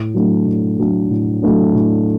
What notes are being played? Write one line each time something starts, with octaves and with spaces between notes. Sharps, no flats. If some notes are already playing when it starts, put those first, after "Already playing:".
Already playing: A2
F#3 A3 D4
A2
F#3 A3 D4
A2
F#3 A3 D4
A2